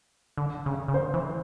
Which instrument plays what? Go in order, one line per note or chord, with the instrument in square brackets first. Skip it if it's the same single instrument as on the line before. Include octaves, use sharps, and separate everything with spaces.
[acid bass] D3
C#3
C#3
[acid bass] D3 [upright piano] C5
[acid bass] E3